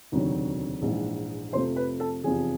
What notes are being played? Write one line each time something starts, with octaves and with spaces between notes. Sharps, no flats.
E1 D2 C3 D#3 F#3
A#1 G#2 E3 G#3
F2 C3 F3 A3 C5 C6
B4 B5
A4 A5
F1 E2 C3 F3 G#4 G#5